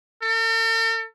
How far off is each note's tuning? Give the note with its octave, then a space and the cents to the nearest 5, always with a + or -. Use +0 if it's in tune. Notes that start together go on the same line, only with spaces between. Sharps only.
A4 +45